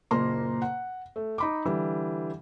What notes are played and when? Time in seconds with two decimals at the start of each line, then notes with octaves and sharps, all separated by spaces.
0.11 F#1 A#2 A#3 A#5 C6
0.62 F#5
1.16 A3
1.38 D#4 B5 D6
1.65 D3 E3 G3